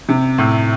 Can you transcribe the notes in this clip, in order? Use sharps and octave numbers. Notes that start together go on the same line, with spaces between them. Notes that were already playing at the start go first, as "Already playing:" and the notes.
C3
A2